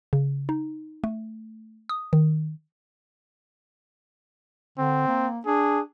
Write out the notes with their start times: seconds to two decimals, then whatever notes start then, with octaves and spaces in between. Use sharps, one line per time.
0.13 C#3
0.49 D#4
1.04 A3
1.89 D#6
2.13 D#3
4.78 D3 C4
5.08 A#3
5.46 D4 G#4